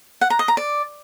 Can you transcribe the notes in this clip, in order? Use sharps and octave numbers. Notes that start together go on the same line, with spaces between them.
F#5
A#5
D#5
A#5
D5